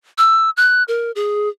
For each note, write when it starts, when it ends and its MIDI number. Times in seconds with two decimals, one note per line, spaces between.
0.18 0.50 88
0.57 0.83 90
0.88 1.12 70
1.15 1.49 68